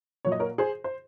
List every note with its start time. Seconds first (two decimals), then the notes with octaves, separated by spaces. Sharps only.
0.25 A#2 F#3 C#5
0.32 D#5
0.39 A#4 C#5
0.58 G#4 C5
0.84 C5